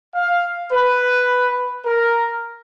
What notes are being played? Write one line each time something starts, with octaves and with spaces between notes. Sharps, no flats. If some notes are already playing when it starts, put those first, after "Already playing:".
F5
B4
A#4